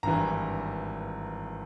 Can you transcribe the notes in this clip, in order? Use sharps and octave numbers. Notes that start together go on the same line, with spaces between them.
G#1 G2 E3 A#5